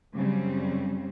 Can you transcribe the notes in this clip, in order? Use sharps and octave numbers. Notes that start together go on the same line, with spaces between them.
F#2 C#3 F#3 G3 C4